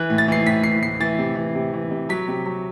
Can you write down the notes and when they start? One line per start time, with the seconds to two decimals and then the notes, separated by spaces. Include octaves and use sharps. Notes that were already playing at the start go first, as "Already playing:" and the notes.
Already playing: E3 F#6
0.10 A2
0.18 A6
0.28 E3 C7
0.46 A2 B6
0.63 E3 C7
0.82 A2 C7
1.00 E3 A6
1.19 C3
1.36 E3
1.55 C3
1.74 E3
1.91 C3
2.09 F#3 B6
2.28 C3
2.46 F#3